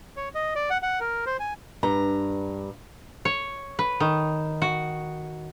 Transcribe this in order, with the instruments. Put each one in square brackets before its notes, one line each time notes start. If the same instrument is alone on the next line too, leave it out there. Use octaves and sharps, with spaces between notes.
[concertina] C#5
D#5
D5
F#5
F#5
A#4
C5
G#5
[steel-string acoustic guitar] G2 A#5
[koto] C#5
B4
D#3
F#4